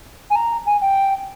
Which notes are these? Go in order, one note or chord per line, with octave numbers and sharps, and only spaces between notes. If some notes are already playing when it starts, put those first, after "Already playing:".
G#5
A#5
G#5
G5